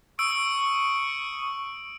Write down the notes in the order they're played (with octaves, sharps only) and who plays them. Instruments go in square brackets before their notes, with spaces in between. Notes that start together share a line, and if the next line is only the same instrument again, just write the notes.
[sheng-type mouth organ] C#6 D#6 [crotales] E6 D7